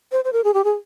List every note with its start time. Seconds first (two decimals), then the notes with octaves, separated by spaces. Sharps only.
0.12 C5
0.24 C5
0.33 A#4
0.44 G#4
0.54 G4
0.64 G#4